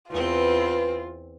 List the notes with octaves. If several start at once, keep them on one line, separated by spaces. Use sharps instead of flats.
E2 C4 F4 B4